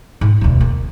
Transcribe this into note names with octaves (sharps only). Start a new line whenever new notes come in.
G#2
E1 D2
A#3